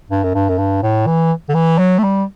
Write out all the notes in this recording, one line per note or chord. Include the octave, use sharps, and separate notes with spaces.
G2
F#2
G2
F#2
G2
A2
E3
D3
E3
F#3
A3
G3